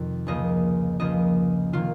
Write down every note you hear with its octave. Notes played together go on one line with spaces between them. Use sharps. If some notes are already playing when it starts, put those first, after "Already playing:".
Already playing: F2 C3 D#3
C#2 C#3 F3 A#3 D#5
C#2 C#3 F3 A#3 D#5
C3 D#3 A#3 F4